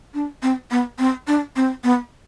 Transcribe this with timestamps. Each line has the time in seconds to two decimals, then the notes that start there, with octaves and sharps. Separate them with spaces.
0.14 D4
0.42 C4
0.71 B3
0.99 C4
1.28 D4
1.56 C4
1.84 B3